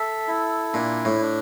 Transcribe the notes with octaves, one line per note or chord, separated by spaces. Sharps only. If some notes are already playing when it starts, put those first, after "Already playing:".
Already playing: A4 E5
E4
A#2 D4
A2
D4